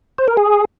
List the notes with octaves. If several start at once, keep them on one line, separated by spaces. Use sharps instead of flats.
C5
A#4
G#4